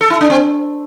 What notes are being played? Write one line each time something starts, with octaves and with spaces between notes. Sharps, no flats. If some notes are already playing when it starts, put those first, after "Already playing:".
A4
E4
D4
C4